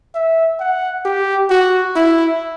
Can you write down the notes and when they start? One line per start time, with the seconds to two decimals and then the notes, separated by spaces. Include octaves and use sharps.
0.14 E5
0.60 F#5
1.05 G4
1.50 F#4
1.95 E4